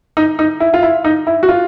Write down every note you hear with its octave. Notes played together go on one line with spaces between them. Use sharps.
D#4
D#4
E4
F4
E4
D#4
E4
F#4
F4